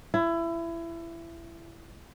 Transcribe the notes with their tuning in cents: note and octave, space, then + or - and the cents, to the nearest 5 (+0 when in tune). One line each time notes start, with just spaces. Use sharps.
E4 +25